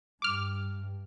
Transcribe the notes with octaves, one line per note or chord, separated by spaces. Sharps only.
G2 D6 F6